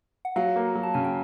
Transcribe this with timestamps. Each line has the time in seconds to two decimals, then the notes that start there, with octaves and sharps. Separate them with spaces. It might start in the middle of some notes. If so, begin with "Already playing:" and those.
0.25 F#5
0.36 F#3 F5
0.56 A#3
0.75 F#3
0.83 A5
0.94 C#3 G#5
1.04 G5